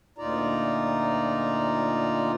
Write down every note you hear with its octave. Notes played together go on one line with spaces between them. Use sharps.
D2 A#2 D#4 F4 D5 A#5